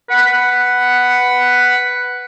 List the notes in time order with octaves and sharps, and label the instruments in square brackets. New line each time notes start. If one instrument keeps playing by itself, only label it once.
[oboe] B4 [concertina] F#5